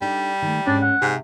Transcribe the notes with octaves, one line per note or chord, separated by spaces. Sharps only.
G3 D4 D#4 A4
D#3 A3
G#2 C#4 D4
F#5
G#2 C3 G4